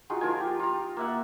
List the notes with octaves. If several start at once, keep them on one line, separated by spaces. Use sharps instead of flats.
D#4 F4 F#4 G#4
F3 F4 A#4 G#5
G4
F4 A#5
A#3 E5 F#5